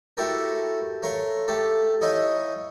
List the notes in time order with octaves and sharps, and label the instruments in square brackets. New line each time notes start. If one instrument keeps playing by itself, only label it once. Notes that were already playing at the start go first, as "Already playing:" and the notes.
[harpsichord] A3 E4 F#4 G4 A4 A#4
A3 A#4 C#5 F5 C6
A3 G4 A4
D#4 E4 C#5 D#5 F5 G#5